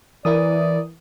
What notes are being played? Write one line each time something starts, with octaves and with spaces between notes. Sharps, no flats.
E3 E4 A#4 D5 D#6